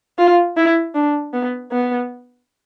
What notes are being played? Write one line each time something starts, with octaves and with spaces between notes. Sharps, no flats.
F4
E4
D4
B3
B3